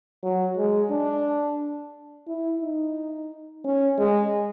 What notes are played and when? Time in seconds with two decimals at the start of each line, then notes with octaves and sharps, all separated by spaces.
0.23 F#3
0.57 G#3
0.91 D4
2.27 E4
2.61 D#4
3.65 C#4
3.98 G#3